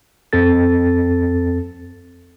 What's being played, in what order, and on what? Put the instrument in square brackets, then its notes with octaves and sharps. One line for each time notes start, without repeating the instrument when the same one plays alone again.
[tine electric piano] F2 C4 A4 A6